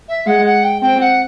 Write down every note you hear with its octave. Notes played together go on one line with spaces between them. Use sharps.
E5
G#3 F#5
F#5
G5
C4 G5
F#5